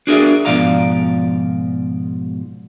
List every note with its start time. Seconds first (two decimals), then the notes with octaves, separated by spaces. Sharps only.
0.07 D4 F#4 G#4 A#4 D5 E5
0.45 G#2 B2 F3 D5 F5 A#5